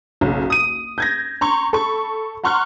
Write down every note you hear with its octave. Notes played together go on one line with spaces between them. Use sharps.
F#1 B1 C#3
D#6 D#7
G6 G#6 A#6
A#5 C6 C#6
A4 B5 C#6
F#5 A#5 C6 C#6 F6 F#6